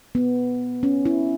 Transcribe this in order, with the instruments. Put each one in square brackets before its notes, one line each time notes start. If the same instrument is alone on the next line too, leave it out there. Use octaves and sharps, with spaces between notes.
[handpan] B3
C#4
E4